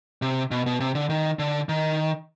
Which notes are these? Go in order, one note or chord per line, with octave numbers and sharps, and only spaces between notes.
C3
B2
B2
C3
D3
D#3
D3
D#3